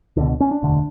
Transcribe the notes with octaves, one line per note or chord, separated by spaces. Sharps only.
C#2 B2 D3
C#4
D4
E1 D2 D3